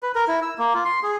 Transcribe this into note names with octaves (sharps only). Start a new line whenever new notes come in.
B4
A#4
E4
E6
A#3
F4
C6
G#4